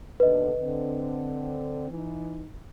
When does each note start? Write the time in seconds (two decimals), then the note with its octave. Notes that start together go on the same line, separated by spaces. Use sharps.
0.20 D#2 B2 D3 B4 D#5
0.59 D3 C4
1.90 E3 D#4